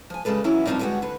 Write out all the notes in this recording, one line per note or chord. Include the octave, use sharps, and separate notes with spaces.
F3 G#5
C#3 G3 G#3 A4 B4
D#2 E3 F#3 B3 C#4 E4
G2 C#3 F3 C4 D4 D#4
D3 G3 G#3 B3 F#4
D3 B4